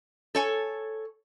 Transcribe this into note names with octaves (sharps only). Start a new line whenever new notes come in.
A4 C#5 G#5